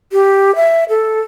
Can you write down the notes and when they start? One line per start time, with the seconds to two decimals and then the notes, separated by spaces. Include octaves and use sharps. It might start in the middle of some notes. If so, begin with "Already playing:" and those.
0.12 G4
0.55 E5
0.89 A4